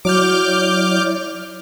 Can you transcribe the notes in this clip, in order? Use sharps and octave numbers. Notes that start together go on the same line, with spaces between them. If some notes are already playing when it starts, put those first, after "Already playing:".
F#3 E4 C#5 D5 D6 F6 G6